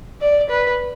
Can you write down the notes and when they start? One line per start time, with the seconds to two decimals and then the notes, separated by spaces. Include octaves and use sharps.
0.21 D5
0.50 B4